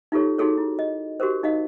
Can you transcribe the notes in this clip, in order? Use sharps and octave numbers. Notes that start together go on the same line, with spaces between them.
D#4 F4 G4 A4 C#5
D#4 F#4 G#4 A4 C#5
E4
D#5
F#4 G4 A#4 C5
D#4 D#5 F5